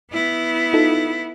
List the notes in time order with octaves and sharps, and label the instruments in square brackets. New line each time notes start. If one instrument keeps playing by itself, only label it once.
[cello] B3 E4
[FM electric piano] D#4 F4 A4